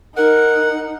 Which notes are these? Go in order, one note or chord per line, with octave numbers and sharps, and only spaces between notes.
D#4 A#4 F#5